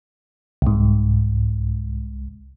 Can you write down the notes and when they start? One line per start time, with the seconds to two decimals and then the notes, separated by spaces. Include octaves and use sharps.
0.62 C2 G#2